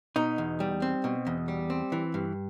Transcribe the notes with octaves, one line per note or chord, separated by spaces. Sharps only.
B2 D#4
E2
G3
C4
B2
E2
G3
C4
E3
G2